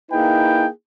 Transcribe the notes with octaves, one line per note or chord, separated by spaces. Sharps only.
A#3 D#4 E4 G#4 B4 G5